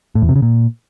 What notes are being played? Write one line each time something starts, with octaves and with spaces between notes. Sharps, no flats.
A2
E2
C3
C#3
A#2